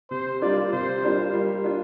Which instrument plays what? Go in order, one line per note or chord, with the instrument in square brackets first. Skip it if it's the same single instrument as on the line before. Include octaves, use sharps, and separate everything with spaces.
[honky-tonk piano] C3 [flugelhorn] C5
[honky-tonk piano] G3 A#3 D4 F4 [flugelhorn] D5
[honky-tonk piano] C3 [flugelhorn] C5
[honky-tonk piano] G3 A#3 D4 F4
[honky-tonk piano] G3 [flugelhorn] A#4
[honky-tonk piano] D4 F4